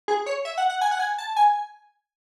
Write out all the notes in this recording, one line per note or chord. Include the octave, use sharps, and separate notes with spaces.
G#4
C#5
E5
F#5
F#5
G#5
F#5
G#5
A5
G#5